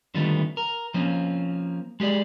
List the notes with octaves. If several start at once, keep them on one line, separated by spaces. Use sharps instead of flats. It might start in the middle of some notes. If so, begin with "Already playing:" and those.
D3 D#3 G3 A3 B3 F4
A#4
F3 A#3 C4 C#4
G#3 G4 G#4 D5